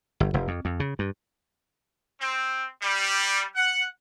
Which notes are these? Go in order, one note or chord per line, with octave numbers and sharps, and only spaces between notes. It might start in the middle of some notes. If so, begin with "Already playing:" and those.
G1
F1
F2
F2
C#3
G2
C4
G3
F#5